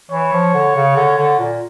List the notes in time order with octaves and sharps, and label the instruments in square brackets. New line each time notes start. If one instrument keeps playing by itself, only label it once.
[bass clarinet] E3 [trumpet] C#5
[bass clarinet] F3
D3
C#3
D3
D3
A#2